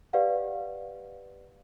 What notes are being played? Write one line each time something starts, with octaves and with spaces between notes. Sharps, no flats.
G4 B4 D5 D#5 F5 F#5